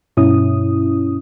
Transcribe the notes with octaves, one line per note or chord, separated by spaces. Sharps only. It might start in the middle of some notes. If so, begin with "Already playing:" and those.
G2 B2 C#4 E4 D#6